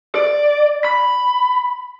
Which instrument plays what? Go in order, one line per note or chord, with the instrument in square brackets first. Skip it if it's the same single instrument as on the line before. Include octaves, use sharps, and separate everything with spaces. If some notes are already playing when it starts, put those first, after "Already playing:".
[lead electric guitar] D5
B5